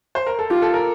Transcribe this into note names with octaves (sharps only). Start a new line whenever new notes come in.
C5
A#4
A4
F4 G4
A4
A#4